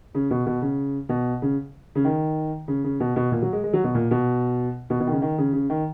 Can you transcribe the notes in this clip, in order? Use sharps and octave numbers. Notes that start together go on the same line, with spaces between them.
C#3
B2
B2
C#3
B2
C#3
C#3
D#3
C#3
C#3
B2
B2
A#2
F#3
G#3
G#3
F#3
B2
A#2
B2
B2
B2
D#3
C#3
D#3
C#3
C#3
D#3